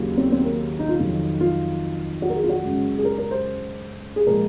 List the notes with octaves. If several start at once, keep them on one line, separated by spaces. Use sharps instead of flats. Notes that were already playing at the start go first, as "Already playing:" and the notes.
Already playing: D#2 C#3 F#3 A#3
C4
C4
A#3
D#4
F4
F2 D#3 F#3
F4
F#4
A#4
G#4
F4
F#4
F#2 C#3 G#3
G#4
A#4
A#4
C5
G#4
A#2 F3 G#3 A#4